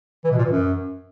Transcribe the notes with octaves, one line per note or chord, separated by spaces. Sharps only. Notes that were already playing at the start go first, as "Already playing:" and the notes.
E3
B2
A#2
E3
F#2